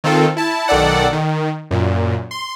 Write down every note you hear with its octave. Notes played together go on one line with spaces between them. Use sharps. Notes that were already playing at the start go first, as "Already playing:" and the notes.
D#3 C4 F4 A4
E4 A5
B1 D#3 A4 D5 F#5
D#3
F#2 A#2
C6